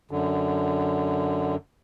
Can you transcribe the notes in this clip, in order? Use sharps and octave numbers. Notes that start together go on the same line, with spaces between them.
F#2 D3